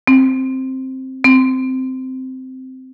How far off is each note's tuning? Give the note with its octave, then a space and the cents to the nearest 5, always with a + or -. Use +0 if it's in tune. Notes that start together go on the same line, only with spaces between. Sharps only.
C4 +5
C4 -10